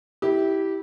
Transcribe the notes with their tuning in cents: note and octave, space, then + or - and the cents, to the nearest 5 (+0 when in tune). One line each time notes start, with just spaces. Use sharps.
E4 -15 G4 -10